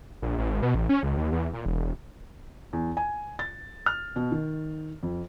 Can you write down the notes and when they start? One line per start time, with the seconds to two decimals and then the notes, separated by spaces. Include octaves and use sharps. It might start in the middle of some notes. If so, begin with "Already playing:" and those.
0.22 A#1
0.38 A1
0.49 G#1
0.62 B2
0.75 A1
0.89 C#4
1.03 C#2
1.17 D#2
1.32 E2
1.53 A#2
1.65 E1
1.82 E1
2.73 E2
2.97 G#5
3.39 A6
3.86 F6
4.16 B2
4.32 D#3
5.03 F2